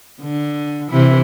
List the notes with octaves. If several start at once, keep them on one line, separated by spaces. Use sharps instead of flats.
D3
C3 E3 E4